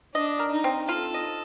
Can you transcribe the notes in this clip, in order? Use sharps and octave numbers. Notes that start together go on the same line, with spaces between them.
D4 D#5
A#4
D#4
C4
F4 A4
D#5